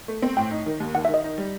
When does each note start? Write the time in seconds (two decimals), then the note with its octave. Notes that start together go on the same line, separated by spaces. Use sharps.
0.08 A3
0.22 C4
0.37 A2 G5
0.51 D#4
0.66 D#3
0.80 D#2
0.95 D#3 F#5
1.05 E5
1.09 D#3
1.14 D#5
1.24 D#4
1.38 G3